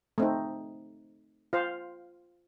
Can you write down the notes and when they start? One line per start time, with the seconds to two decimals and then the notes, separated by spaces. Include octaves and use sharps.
0.18 A3 C4 D#4
1.53 F4 C5 F5